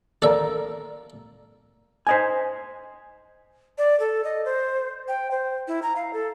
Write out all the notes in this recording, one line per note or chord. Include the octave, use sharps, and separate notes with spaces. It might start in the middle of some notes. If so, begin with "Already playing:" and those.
A4 A#4 D5 E5
C5 D#5 G#5
D5
A4
D#5
C5
G5
C5
E4
A#5
F5
A4